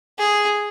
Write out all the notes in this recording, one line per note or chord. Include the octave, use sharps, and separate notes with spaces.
G#4